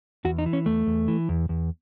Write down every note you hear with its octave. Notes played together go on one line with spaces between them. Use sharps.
E2 F#4
D#4
E3
C#4
E2 A3
E2
E3
E2
E2